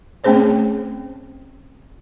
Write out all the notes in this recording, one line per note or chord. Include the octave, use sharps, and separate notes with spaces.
A3 C4 C#4 G#4 C5 C#5